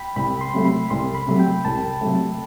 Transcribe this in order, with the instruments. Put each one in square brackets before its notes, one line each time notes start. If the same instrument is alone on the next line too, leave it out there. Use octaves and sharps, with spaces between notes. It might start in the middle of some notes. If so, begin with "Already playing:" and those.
Already playing: [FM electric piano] G5 B5
[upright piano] C2 [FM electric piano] B5
[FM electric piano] C6
[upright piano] C3 F#3 A3
[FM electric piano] B5
[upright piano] C2 [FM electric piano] C6
[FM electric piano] B5
[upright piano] C3 F#3 A3
[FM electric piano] G5
[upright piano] C2 [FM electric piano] A5
[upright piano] C3 F#3 A3